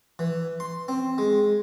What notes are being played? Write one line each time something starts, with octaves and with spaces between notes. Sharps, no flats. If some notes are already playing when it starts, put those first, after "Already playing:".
E3
C6
C4
G#3